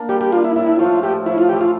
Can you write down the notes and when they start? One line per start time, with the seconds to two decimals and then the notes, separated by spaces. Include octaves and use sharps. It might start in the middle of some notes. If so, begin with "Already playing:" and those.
Already playing: A#3 D4
0.09 G3 G4
0.21 G4
0.32 A#3 D4 F4
0.44 E4
0.56 A2 E4
0.79 F3 A3 F4
1.02 A2 G4
1.26 F3 A3 E4
1.38 F4
1.49 E3 G4
1.61 F4